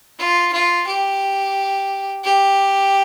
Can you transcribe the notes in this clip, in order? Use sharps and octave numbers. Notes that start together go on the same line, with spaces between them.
F4
F4
G4
G4